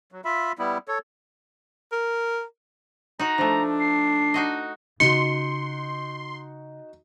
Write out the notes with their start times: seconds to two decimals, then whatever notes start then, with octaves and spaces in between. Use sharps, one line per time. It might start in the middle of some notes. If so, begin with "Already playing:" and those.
0.12 F#3
0.25 F4 E5 B5
0.59 G3 B3 E4
0.88 A4 C#5
1.92 A#4
3.19 D#4 F#4 A#5
3.38 F3 A3 D4
3.80 C7
4.34 D#4 F#4 D#5
5.00 C#3 D#4 F4 F#4 C6 C#7